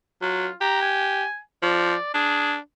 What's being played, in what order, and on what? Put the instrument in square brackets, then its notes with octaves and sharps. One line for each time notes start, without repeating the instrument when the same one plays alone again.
[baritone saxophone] F#3 [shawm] F4
[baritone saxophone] G4 [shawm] A#5
[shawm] G#5
[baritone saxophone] F3 [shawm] D5
[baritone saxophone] D4 [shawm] G#4